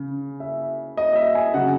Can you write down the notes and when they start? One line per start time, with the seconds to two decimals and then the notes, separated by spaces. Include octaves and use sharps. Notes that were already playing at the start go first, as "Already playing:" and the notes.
Already playing: C#3
0.40 E5
0.97 D#5
1.13 D#5
1.15 E5
1.35 G#5
1.54 C#3 F#3 F#5